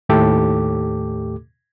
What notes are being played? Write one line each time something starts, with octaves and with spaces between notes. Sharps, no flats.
D#2 A2 A3 G4 A4 D6